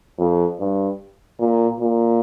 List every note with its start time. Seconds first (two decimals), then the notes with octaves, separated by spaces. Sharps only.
0.19 F2
0.60 G2
1.39 A#2
1.80 A#2